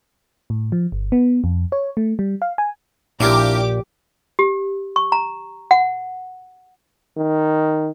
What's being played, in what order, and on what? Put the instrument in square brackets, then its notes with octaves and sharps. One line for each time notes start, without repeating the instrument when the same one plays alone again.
[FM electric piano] A2
F3
G1
B3
F2
C#5
A3
G3
F5
G#5
[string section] A#1 G4 D6 [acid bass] A#2 [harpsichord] D4 E4 A#4
[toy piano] G4
C#6
A#5
F#5
[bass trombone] D#3